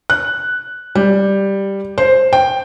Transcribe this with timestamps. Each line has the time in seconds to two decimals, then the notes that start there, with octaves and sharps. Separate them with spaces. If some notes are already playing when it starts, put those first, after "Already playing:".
0.10 F#6
0.95 G3
1.98 C5
2.33 G5